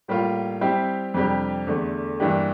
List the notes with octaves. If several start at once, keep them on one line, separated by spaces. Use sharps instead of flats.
A2 G3 A#3 F4
G3 C4 E4 G4
F2 C3 G3 D4 G4
E2 D3 A3
G2 E3 A#3 D4 G4